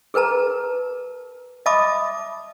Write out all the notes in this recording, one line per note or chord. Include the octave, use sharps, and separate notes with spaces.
G#4 A#4 B4 A5 A#5
D#5 E5 A5 B5 D6 D#6